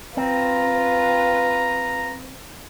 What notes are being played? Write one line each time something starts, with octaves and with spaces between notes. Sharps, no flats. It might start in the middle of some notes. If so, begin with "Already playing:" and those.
C4 F4 B4 A#5